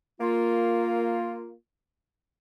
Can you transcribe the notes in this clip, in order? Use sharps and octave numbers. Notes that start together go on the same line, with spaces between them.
A#3 F4